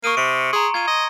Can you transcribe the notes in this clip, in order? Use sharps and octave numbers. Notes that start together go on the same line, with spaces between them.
A#3 C#6 D#6 D#7
C3 C#7 D7
G#4 A#5 C6
F4 G#6 D#7
D#5